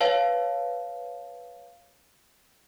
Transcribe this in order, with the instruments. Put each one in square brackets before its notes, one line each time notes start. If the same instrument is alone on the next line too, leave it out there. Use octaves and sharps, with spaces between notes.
[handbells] B4 C#5 F5 A5